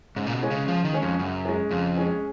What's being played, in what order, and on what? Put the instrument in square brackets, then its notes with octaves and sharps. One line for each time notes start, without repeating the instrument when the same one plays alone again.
[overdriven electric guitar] G#2 [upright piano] C#3
[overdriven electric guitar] A#2
B2
[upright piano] G#3 C#4 G#4
[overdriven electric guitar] C#3
[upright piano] C#3 [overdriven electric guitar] F3
[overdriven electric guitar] D#3
[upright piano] G#3 C#4 G#4
[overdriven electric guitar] F2
[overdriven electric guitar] F#2 [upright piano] C#3
[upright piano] G#3 C#4 G#4
[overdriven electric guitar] F2 [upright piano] C#3
[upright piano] G#3 C#4 G#4